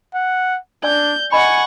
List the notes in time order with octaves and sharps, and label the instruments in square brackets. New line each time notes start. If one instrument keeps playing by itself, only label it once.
[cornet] F#5
[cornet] D4 [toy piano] D5 G#5 E6 [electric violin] G6
[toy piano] D#5 B5 [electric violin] F#5 C#6 [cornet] G#5